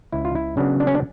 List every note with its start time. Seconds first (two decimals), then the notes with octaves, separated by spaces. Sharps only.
0.12 C#2 E4
0.25 F4
0.35 E4
0.57 C#3 F#3 B3 D4
0.80 D4
0.87 C#4
0.95 D4